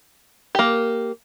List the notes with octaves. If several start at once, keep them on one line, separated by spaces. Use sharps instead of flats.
A#3 G4